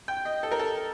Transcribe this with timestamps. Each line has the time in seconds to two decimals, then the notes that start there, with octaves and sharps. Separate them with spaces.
0.08 G5
0.25 D#5
0.43 A4
0.51 A#4
0.59 A4